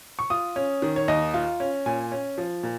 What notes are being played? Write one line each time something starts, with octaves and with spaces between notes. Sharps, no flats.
C#6
F4 D#6
C#4
D#3
C#5
D#2 D#5
F4
C#4
A#2 G#5
C#4
F3
A#2